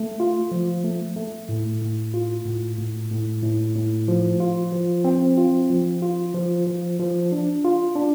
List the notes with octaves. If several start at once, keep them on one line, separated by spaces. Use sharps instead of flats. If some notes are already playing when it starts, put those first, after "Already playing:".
Already playing: A3
F4
F3
A3
A3
A2
A2
F4
A2
A2
A2
A2
A2
F3
F4
F3
C4
F4
F3
F4
F3
F3
F3
D4
F4
D4